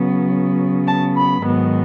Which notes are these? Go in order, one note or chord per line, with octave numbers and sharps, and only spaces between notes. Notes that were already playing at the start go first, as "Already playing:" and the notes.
Already playing: C#3 F#3 B3
A5
B5
G#2 D#3 F#3 B3